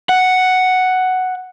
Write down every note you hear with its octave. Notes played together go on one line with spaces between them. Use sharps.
F#5